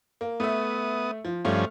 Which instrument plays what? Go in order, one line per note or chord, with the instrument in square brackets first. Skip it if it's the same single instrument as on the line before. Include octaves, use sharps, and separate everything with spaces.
[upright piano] A#3
[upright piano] A3 E5 [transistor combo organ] B3 D#6
[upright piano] F3
[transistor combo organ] G2 F3 C#4 [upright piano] A3 F5 F6